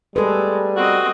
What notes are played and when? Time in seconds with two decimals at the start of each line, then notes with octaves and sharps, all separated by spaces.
0.16 G3 G#3 A4 B4
0.77 C4 F#4 D#5